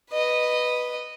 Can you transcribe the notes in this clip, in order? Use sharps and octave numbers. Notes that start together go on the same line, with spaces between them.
B4 D#5